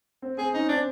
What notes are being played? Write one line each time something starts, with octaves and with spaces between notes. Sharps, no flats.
C4
C4 G#4
C#4 D#4
C4 D4